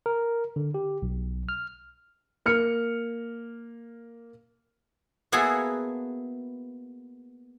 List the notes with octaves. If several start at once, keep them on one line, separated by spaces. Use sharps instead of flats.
A#4
D3
G4
B1
F6
A#3 F6 C#7
A#3 B3 E4 F#4 G#4 A4